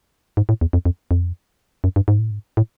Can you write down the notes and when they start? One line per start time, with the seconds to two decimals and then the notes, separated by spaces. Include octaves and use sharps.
0.37 G#2
0.49 A2
0.61 E2
0.73 F2
0.85 F2
1.11 F2
1.84 F#2
1.96 G2
2.08 G#2
2.19 A2
2.31 G#2
2.57 A2